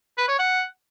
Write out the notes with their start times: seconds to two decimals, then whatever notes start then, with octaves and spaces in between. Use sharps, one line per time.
0.18 B4
0.28 C#5
0.39 F#5